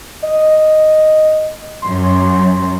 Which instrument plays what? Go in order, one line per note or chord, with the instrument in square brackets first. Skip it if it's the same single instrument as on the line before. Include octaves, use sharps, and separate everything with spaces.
[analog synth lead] D#5
[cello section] F#2 F#3 [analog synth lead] C6